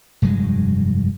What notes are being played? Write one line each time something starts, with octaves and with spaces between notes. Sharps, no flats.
F1 G2 F#3 G#3